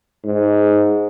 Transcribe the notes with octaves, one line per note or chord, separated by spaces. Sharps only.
G#2